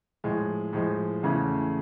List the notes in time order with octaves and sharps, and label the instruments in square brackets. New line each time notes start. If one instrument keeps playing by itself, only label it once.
[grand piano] A2 F3 G#3
A2 F3 G#3
E2 C#3 E3 A3